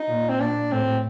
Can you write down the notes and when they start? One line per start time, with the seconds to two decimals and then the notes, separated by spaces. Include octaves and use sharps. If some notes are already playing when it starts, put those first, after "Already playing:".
Already playing: D#4
0.08 A#2
0.29 C4
0.39 A#2 D4
0.71 A2 C4